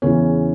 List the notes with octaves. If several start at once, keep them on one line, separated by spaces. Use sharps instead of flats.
E2 C#3 E3 C#4